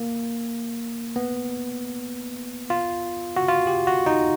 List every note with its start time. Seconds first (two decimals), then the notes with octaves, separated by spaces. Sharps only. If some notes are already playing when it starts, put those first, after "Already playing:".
Already playing: A#3
1.16 B3
2.70 F4
3.37 F#4
3.48 F4
3.67 G4
3.87 F#4
4.06 D#4